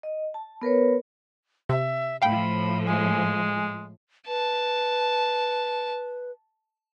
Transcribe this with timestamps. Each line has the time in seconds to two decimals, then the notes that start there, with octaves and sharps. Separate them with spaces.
0.03 D#5
0.34 A5
0.62 B3 A#4 B4 C#5
1.69 C3 E5
2.22 A2 F3 F5 G5 B5
2.86 G#3 G#5
4.27 B4 A5